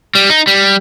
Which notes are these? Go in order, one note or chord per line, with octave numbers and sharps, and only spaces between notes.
G3
D#4
G3